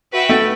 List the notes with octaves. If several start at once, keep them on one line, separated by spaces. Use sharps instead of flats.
F#4 B4 E5 G5
A3